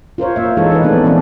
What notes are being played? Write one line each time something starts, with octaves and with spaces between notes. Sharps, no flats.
F4 A#4 C5 C#5
A#3 E5
E3 G#3 D#4 A4 C#5
D#4 B4
F3 A3 B3 C4 D4 D#4
E3 B3 C#4 D4